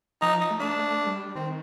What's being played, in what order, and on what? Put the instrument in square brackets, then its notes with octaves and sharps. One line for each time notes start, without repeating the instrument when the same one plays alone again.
[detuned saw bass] F3 [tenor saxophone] D#4
[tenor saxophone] D#4
[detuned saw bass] A3
[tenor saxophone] D4
[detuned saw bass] A3
G3
[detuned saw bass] D#3 [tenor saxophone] C4